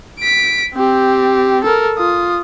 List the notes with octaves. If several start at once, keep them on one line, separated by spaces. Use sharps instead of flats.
B6 D7
C4 G4
A4 A#4
F4 D#6